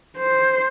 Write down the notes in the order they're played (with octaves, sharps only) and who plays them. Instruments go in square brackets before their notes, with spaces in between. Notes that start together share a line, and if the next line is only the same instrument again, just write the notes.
[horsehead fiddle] C5